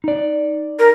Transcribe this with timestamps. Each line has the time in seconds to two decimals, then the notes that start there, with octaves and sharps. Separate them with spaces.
0.04 D#4 D5
0.79 A#4